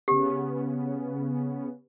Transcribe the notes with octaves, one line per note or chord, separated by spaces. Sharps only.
C#3 B3 C#4 G4